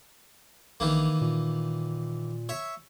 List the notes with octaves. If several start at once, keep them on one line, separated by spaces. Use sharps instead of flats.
A#1 D#3 E3 A#3
A#2
C#5 E5